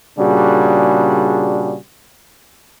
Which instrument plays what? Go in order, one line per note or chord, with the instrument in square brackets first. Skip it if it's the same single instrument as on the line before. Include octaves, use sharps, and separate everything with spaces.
[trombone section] A#2 C#3 G3 D4 F#4 G#4